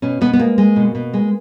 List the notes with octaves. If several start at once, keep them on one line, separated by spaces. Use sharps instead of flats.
B2 C#4
B2 B3
B3
G#3 A#3
G#3
B2
B2
G#3